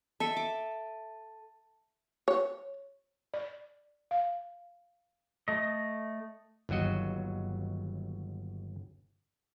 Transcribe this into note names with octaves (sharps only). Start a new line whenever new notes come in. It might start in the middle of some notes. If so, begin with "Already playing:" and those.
A4 E5 A5
D6
C#5
D5
F5
A3 D#5
G1 D#2 F#3 F#4 D#5